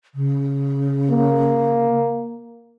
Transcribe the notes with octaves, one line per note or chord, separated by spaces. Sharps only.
C#3
A#3